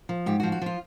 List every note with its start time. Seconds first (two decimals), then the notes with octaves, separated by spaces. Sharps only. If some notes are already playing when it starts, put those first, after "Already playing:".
0.09 F3
0.26 G#2 G4
0.40 F#4
0.43 F3
0.52 F#4
0.62 F3 F4